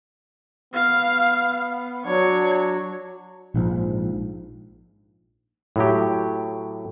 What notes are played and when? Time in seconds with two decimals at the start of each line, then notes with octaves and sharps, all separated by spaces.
0.74 B3 F5
2.06 F#3 D4 C#5
3.54 A#1 G#2 F3
5.76 A2 F#3 G4